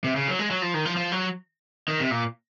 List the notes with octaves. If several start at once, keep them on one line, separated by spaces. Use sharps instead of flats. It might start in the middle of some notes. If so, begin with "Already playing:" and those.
C3
C#3
F#3
G#3
F#3
F3
D#3
F3
F3
F#3
D#3
C3
A#2